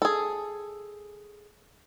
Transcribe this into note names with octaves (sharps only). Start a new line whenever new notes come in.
G#4 A4